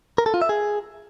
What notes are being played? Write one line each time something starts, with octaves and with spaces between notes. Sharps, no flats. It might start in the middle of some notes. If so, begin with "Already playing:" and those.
A#4
A4
F4
E5
G#4